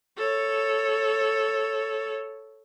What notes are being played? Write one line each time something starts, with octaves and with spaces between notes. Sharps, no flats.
A4 C#5